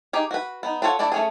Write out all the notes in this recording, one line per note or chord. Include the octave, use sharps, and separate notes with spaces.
D#4 G4 G#4
F#4 B4
B3 D#4
D4 F4 A4 C#5 F#5
A3 D4 E4 D5
A3 C#4 G#4